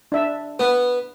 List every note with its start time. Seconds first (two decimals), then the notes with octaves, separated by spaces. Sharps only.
0.12 D4 E5
0.59 B3 B4